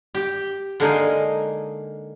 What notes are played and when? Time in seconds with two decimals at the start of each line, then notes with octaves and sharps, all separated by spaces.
0.15 G4
0.80 D3 G#3 A#3 D#4